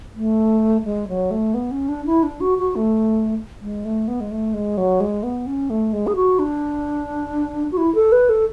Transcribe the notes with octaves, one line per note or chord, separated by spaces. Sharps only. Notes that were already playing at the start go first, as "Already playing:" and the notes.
A3
G#3
F#3
A3
B3
C#4
D4
E4
D4
F#4
F#4
A3
G#3
A3
B3
G#3
A3
G#3
F#3
G#3
B3
C#4
A3
G#3
G#4
F#4
D4
F#4
E4
A4
B4
A4